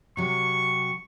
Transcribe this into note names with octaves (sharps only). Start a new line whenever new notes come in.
C3 F#3 C#6